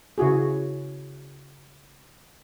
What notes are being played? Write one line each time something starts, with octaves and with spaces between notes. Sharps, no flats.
C#3 E4 F#4 G#4